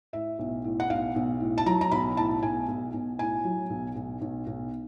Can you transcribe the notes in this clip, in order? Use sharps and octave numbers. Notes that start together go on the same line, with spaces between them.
A2 E5
B1
A2
F#5
B1 F5
B1
A2
A5
F#3 A#5
A#5
B1 B5
A2 A5
B1 G#5
B1
B1
A2 G#5
F#3
B1
B1
B1
B1